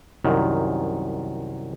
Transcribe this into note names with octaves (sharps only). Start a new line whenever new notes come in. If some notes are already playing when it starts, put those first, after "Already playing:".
C2 F#2 D#3